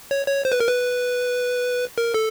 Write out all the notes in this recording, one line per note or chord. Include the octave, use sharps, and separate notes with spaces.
C#5
C#5
C5
B4
A#4
B4
A#4
A4